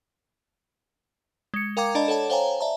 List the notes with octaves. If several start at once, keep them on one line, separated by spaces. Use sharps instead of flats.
G#3 C#7
A#4 F5 G5 A#5 D6 G#6
D4 D5 D#5 A5 B5
A4 C#5 F#5 A5
C5 C#5 F5 G5 G#5 A#5
D5 E5 A5 A#5